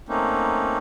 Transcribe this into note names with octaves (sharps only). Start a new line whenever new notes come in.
A3 A#3 C4 C#4 D#4